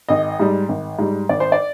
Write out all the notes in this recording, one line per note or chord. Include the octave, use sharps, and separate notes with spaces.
G#1 D#5
G#2 G3
G#1
G#2 G3
G#1 D5
C5
D5